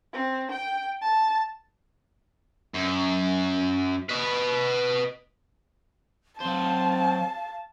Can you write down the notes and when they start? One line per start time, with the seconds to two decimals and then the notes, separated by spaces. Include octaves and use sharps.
0.14 C4
0.52 G5
1.01 A5
2.75 F#2
4.09 B4 D#5
6.41 F#3 C4 C5 F5 A5